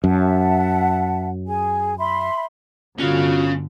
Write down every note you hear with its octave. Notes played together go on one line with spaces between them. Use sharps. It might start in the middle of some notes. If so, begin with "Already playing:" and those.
F#2 E5 F#5 A5
G#4 G#5
E5 B5 C6
G1 D3 C#4 F4 F#4 F5